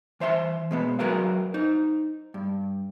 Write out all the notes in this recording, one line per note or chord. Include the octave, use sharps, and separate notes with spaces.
E3 C5 E5 G#5 C6
B2 G#3 B3
F#3 F#4 G#4 A#4 B4 F5
D#4 C5
G2